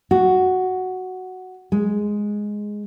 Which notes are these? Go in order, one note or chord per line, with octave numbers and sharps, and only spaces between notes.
F#4
G#3